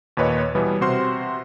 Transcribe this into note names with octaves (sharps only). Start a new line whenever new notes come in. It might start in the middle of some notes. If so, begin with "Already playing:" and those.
D#2 A#2 B4 C#5 D#5
B2 E3 G3 B3
C3 F#4 C5 C6 F6